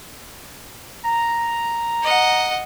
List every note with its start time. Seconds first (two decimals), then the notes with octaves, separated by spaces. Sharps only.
1.05 A#5
2.03 D#5 F#5